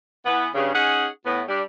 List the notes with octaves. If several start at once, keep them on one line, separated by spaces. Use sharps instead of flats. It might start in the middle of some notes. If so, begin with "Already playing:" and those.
E3 B3
G2 C#3
C#4 D#4 G#4 F#5
A2 B3
G3 D4